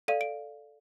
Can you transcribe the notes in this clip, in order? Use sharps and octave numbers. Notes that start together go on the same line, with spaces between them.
A4 D5 F5 D#7
D7